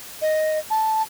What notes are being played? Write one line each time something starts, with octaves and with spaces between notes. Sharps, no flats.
D#5
A5